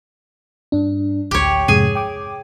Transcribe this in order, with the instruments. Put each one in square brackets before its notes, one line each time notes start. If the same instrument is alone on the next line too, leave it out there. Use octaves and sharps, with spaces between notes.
[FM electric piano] G2 D4
[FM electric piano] A1 D2 [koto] G4 C#5
[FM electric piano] F2 G#2 C3 [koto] G#4 G#5
[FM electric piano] G5 D6